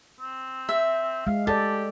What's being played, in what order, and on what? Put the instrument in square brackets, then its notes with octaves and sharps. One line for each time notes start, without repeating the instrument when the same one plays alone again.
[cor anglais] C4
[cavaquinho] E5
[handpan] G#3 [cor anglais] F5
[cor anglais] G4 [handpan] A4 D5 [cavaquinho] A5